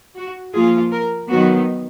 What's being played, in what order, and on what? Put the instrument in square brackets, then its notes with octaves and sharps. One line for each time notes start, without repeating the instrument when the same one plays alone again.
[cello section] F#4
F3 A#3 F4 G#4
A#4
D#3 F#3 B3 F#4